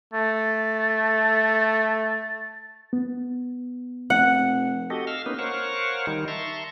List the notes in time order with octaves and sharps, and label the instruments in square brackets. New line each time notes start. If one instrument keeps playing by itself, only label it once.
[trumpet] A3 [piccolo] A6
[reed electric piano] B3
[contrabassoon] F1 [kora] F#5
[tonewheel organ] F#4 G4 A4 D#5
F5 E6 F6
A#3 B3 C#4 D#4 B4
A#4 C5 C#5 F5 F#5 C#6
D#3 G3 D#4 A#4
E5 A5 A#5 C6 C#6